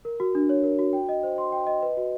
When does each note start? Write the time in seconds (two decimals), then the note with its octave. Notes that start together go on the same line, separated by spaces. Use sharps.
0.05 A#4
0.20 F#4
0.35 D4
0.49 C#5
0.64 A#4
0.79 F#4
0.93 G5
1.09 D#5
1.23 C5
1.38 C6
1.52 G5
1.67 D#5
1.82 B4
1.97 F#4